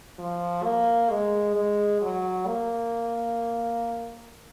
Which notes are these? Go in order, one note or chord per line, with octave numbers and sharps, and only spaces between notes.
F3
A#3
G#3
G#3
F#3
A#3